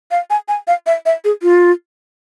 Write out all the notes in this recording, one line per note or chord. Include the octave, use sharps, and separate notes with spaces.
F5
G#5
G#5
F5
E5
E5
G#4
F4